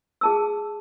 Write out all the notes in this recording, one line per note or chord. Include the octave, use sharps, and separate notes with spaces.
G#4 A5 E6